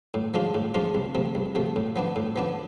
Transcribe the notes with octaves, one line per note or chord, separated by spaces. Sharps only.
A2
F3 G#3 D4 F4
A2
F3 G#3 D4 F4
C2
C3 F3 A3
C2
C3 F3 A3
A2
F3 B3 D4
A2
F3 B3 D4